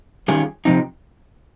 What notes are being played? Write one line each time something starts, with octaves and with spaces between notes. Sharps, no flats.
D#3 G3 C#4 F4 G#4
C3 F3 C4 D#4